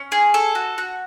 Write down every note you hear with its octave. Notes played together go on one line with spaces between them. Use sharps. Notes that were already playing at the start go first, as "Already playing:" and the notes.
Already playing: C#4
G#4
A4
F#4
F#4